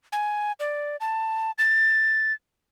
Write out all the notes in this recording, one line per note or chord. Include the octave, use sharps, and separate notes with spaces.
G#5
D5
A5
A6